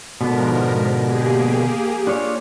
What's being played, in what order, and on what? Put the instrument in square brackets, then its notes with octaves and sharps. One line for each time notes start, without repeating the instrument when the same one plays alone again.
[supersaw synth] G#2 F3 A#4 [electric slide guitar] B2 D3 B3
[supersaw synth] A#3 G4 G#4
[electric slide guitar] D4 F4 C#5